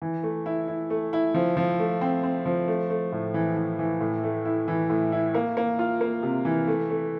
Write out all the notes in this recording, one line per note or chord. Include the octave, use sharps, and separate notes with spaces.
E3
A3
E4
E4
A3
E4
F3
F3
A3
C4
C4
F3
A3
A3
A2
E3
E3
E3
A2
A3
E4
E3
A2
E4
A#3
A#3
F4
A#3
C3
E3
A3
A3